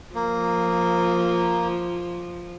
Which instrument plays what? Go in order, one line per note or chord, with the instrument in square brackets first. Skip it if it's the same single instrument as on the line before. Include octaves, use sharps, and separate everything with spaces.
[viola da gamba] F3 [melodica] A#3